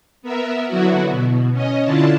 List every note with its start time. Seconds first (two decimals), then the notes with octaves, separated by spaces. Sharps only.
0.22 B3 A#4 E5
0.67 D3 F#3 B3 E4 F#4
1.10 B2
1.52 C#4 D#5
1.84 D3 D4 E4 F4 A5